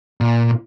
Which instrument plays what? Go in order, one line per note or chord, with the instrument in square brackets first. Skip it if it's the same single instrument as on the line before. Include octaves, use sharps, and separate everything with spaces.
[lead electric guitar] A#2